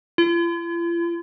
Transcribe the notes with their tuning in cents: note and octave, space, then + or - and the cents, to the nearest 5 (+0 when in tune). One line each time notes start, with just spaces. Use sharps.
F4 -45